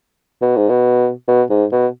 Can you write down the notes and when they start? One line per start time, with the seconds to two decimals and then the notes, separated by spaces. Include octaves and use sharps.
0.42 B2
0.56 G#2
0.69 B2
1.28 B2
1.50 G#2
1.72 B2